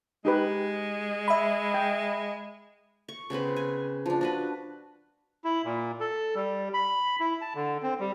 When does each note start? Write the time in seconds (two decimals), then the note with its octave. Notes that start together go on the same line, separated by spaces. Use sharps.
0.25 G#3 D#4 G4 B4
1.28 E5 B5
1.74 G5
3.09 C#6
3.30 C#3 B3 C4 B4
3.56 G#5
4.06 F3 D4
4.21 D4 F#4 B4
5.44 E4
5.64 A#2
6.00 A4
6.35 G3
6.74 B5
7.20 E4
7.41 A5
7.55 D3
7.83 C4
8.00 G3